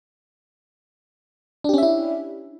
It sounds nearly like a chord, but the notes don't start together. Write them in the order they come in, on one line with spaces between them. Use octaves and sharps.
D4 G4 C#4 E5 E4